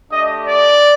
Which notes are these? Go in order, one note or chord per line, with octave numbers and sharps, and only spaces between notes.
A3 D4 G4 D#5
D5